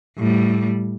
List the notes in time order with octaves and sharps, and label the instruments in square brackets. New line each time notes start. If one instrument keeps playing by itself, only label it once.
[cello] A2 G3